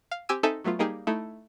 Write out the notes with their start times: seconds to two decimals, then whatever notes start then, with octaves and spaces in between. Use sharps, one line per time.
0.11 F5
0.29 C4 G4 G#5 E6 D#7
0.43 C4 D#4 A4 E5 G#5
0.64 F#3 A3 B3 F4
0.79 G3 A#3 D#4 G4 G#4
1.07 A3 D#4 E4